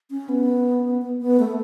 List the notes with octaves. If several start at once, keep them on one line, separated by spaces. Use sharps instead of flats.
C#4
B3
B3
B3
A3